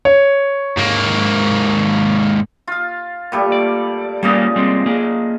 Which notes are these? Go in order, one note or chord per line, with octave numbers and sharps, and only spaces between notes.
C#5
G#2 A#3
F4 F5
A#2 G3 A3
D5
A#2 C#3 G3 A#3 C#4 D#5
G3 G#3 C4
A#3 G#4